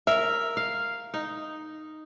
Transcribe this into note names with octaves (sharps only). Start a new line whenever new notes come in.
A#4 E5
F5
D#4